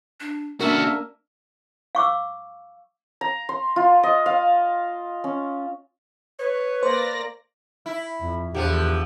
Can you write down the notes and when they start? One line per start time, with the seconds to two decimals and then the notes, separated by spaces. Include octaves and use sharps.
0.20 D4
0.61 A#3 C#4 D4 F#4 A4 A#4 E5
1.95 F5 C#6 D6 E6
3.21 A#5
3.49 C6
3.76 F4
4.03 D#5
4.26 F5
5.24 C#4
6.39 B4 C#5
6.83 A#3 C5 D5 A#6
7.86 E4
8.21 F2
8.54 E2 D3 F3 G4